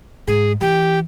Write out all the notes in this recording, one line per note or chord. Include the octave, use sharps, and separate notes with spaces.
G#2 G#4
E3 G4